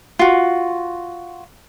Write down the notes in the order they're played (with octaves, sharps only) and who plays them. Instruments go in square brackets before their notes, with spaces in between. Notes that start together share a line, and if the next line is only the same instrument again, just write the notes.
[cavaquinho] F4 F#4